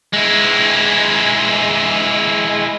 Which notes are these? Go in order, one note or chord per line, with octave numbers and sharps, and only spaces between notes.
G#3 E4